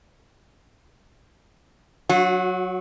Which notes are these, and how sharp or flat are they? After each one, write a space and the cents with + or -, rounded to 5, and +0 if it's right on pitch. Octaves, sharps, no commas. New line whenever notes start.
F#3 +0 F#4 -35